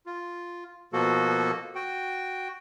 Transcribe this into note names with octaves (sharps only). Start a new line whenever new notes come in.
F4
B2 F3 A#3 F#4 A4
F#4 G5